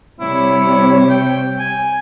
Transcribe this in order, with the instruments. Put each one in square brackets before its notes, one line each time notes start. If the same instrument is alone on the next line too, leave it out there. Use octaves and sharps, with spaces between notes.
[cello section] C3 G3 C#5 [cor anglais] E4
[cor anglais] G5
G#5